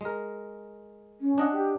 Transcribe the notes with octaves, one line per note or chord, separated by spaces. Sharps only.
G#3 A#4
C#4
D4 D#5 F#5
G4